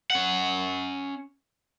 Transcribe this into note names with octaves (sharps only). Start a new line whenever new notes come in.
C#4 F#5